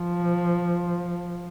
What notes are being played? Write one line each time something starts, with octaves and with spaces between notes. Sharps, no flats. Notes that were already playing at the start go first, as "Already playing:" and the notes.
Already playing: F3